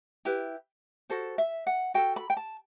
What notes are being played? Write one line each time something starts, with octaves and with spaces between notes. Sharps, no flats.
E4 G4 B4
F#4 A4 C5
E5
F#5
F#4 A4 G5
B5
G5
A5